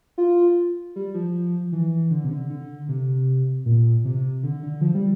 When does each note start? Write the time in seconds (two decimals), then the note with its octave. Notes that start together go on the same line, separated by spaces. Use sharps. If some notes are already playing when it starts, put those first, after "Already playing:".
0.18 F4
0.96 G3
1.14 F3
1.72 E3
2.11 D3
2.24 C3
2.31 D3
2.50 D3
2.88 C3
3.66 A#2
4.05 C3
4.43 D3
4.63 D3
4.81 F3
4.94 G3